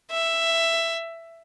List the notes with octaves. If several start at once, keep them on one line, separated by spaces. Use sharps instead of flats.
E5